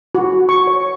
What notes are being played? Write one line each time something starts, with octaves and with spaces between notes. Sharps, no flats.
F#4
C#6
C#5